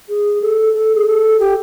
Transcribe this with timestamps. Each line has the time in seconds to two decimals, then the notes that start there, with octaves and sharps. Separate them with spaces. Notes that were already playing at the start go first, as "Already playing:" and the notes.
0.09 G#4
0.42 A4
0.74 A4
0.95 G#4
1.07 A4
1.40 G4